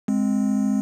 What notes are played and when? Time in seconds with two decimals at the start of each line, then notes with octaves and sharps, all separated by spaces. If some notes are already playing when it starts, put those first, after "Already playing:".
0.08 G#3 C4